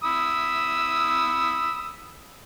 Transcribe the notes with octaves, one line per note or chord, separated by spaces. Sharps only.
B5 D#6 E6